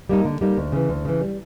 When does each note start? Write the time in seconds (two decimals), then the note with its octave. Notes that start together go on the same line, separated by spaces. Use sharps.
0.09 G3 A#3 D#4
0.25 D3
0.41 G3 A#3 D#4
0.57 D2
0.72 C#3 E3
0.89 D2
1.05 C#3 E3
1.21 G3